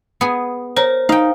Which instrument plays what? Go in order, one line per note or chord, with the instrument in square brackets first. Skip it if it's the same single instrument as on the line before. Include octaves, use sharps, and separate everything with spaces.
[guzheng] B3 G#4
[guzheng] A#4 [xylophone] C5 C#5
[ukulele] D#4 [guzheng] F5 G5